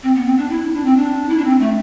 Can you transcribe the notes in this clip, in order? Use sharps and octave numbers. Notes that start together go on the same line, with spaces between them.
C4
B3
C4
D4
E4
D4
C4
D4
E4
D4
C4
A3